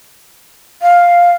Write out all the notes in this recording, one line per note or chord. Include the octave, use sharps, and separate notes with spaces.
F5